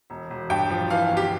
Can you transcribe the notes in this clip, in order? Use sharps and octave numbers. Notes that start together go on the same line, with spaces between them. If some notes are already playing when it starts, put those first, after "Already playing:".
E1
E1
G2 G5
F3
E3 F5
G1
G4